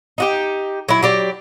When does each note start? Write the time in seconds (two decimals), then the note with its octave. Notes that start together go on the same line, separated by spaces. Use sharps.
0.18 D#4 F#4 G4
0.88 F#3 E4
1.03 F#3 G4 D5